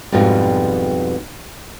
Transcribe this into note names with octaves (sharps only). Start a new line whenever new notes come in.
F2 G#2 B2 G3 B3 F4